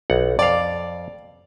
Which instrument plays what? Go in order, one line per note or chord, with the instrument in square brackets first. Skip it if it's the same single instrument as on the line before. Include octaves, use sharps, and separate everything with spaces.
[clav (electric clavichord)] B1 F#5
[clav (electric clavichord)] F2 F5 [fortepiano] D5